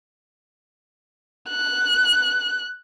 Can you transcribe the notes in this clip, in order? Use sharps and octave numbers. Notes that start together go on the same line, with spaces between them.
F#6